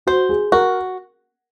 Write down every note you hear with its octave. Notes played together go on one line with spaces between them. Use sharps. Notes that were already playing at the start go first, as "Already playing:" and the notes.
F#4 C5
G#4
F#4 A#4